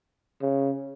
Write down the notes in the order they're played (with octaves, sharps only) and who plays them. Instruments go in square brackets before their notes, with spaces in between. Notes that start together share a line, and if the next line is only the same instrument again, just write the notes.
[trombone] C#3